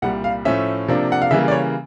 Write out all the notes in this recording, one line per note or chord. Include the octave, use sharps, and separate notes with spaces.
C2 A#2 G3 F#5
F5
A2 F3 A3 C#4 E5
C3 F3 A#3 D4
F#5
F5
C#3 E3 G3 A#3 E5
D5
C#5